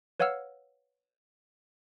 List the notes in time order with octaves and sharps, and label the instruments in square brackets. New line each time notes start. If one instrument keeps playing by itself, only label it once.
[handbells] B4 C#5 F5 F#5 E6 F6